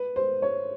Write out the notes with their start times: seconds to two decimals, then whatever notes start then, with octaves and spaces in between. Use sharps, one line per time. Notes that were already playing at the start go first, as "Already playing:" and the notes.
Already playing: B4
0.16 C5
0.42 C#5